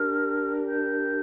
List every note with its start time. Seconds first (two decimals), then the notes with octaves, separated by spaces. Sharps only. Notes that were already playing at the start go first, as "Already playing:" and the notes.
Already playing: D4 G4 A#4 F6
0.67 G6